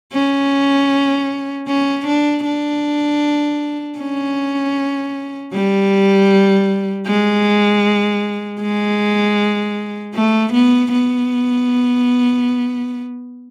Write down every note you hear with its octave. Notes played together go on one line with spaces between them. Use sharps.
C#4
C#4
D4
D4
C#4
G3
G#3
G#3
A3
B3
B3